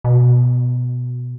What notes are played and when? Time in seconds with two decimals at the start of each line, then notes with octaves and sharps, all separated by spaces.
0.04 B2